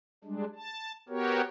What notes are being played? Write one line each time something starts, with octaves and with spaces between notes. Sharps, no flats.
G3 G#3 D4
A5
B3 F#4 G4 A#4 C#5